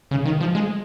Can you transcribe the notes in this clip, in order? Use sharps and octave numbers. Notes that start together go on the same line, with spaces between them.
C#3
D#3
F3
G#3